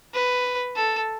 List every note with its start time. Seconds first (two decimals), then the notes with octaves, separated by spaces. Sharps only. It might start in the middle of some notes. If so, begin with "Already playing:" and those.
0.14 B4
0.76 A4